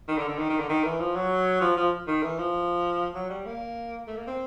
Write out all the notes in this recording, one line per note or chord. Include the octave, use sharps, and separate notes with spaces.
D#3
D3
D3
D#3
D#3
D3
D#3
E3
F3
F#3
F3
F3
D#3
E3
F3
F#3
G3
A#3
A3
A#3
C4